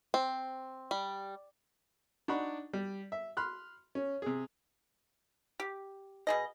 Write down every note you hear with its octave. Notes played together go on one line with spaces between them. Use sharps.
C4
G3
D4 D#4 D5 F#5 B5 C#6
G3
E5
B5 C6 F6 F#6
C#4
C3 G#4
G4
B2 G#4 D#5